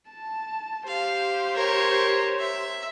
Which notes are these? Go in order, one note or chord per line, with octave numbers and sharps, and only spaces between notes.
A5
G4 C5 F5
A#4 C#5
E5